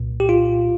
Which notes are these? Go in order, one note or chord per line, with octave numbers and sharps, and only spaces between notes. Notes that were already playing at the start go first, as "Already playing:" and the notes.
Already playing: C2 A#2
G4
F4